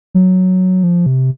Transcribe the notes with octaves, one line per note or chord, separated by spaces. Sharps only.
F#3
F3
C3